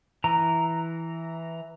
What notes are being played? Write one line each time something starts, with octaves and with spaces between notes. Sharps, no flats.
E3 A#5